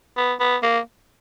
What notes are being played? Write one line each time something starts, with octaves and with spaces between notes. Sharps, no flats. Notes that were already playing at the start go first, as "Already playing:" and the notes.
B3
B3
A#3